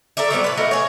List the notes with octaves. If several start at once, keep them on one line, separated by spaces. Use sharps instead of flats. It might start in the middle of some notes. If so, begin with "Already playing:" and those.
A4 A#4 D5 E5
F#3 G3 B3 C4
A2 B4
A3 F#4 A#4 D#5
G#4 C#5